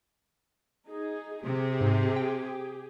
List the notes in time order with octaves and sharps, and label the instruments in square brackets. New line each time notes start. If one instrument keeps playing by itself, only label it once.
[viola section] D#4 G#4
[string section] C3 [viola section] G4 G#4
[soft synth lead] G#2
G5